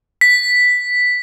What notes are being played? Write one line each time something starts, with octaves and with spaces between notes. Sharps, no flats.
B6